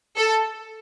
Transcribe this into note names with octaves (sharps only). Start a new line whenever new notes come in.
A4